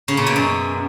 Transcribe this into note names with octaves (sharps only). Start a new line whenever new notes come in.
C#3
A#2
B2
F#2